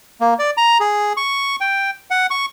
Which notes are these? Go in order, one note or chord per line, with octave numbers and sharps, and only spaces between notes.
A#3
D5
A#5
G#4
C#6
G5
F#5
C#6